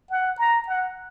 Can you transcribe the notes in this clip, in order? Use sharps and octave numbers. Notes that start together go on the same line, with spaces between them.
F#5
A#5
F#5